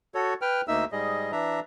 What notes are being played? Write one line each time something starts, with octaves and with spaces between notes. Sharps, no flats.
F#4 A4 C#5
B4 G5 F6
D2 A#3 D#4 E5 E6
G#2 G3 G#4 D#5
E3 D4 E5 A#5